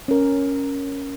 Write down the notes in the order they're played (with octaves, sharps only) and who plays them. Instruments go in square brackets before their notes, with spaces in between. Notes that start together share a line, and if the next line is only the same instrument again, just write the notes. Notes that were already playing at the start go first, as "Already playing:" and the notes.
[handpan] C#4 A#4